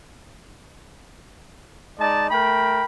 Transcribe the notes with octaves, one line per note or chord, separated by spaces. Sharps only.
G#3 D#4 D5 A5
A3 A#4 G5 B5